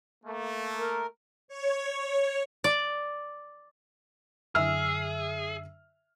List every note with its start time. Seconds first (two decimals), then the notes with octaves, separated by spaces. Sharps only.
0.24 A3 A#3
0.79 A#4
1.48 C#5
2.64 D5
4.55 F#2 D3 G#4 E5 E6 F6